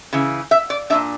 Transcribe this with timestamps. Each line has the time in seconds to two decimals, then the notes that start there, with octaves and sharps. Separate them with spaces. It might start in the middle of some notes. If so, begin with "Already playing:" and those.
0.13 C#3 E3
0.51 E5
0.70 D5
0.90 A#2 A#3 D4 E5